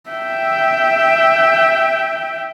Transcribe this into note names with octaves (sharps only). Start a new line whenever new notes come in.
E5 G5